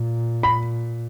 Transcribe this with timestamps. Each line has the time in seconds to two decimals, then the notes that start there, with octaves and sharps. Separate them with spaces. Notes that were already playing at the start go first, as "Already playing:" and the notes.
Already playing: A#2
0.43 B5